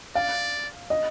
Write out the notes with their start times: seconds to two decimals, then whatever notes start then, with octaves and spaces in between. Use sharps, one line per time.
0.15 D5 F5
0.90 D#5